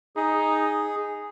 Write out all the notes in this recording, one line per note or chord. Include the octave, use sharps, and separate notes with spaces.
D#4 G#4